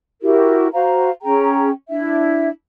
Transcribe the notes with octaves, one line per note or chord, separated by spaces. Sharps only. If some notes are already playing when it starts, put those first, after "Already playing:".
E4 F#4 G4 A#4
F#4 C5 F5 A#5
C#4 G#4 G5 A#5
D4 E4 E5